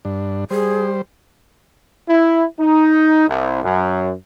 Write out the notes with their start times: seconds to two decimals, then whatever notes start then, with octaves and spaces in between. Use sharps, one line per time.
0.05 G2 D4
0.51 G3 G#4 C5
2.09 E4
2.60 D#4
3.28 C2
3.64 F#2